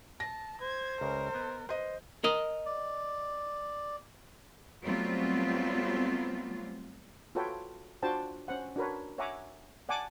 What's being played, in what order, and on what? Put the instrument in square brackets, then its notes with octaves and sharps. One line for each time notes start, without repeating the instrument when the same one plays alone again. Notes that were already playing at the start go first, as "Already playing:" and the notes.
[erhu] A5 [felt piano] A#6
[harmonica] C5 [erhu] G#6
[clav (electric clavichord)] C#2 C#3 [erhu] A#4
[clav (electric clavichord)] B3 D#5
[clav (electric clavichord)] B4 [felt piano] C5 D#5
[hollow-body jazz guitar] A#4 D#5
[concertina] D5
[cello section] F#3 G3 A3 B3 C4 F4
[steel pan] F4 F#4 A4 B4 C#5 G5
D4 F4 F#4 C5 G5 A5
C#4 C5 F#5
D4 F#4 A#4 B4 C#5
C#5 E5 F#5 G#5 A#5 D6
D5 F#5 G#5 A5 D6